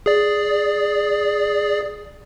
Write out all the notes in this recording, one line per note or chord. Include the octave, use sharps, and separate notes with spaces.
G#4 D5